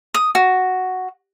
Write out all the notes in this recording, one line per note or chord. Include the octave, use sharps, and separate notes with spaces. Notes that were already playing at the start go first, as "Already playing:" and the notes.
D#6
F#4